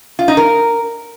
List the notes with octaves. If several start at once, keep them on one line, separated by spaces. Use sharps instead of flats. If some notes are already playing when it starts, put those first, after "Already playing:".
F4
D#4
A#4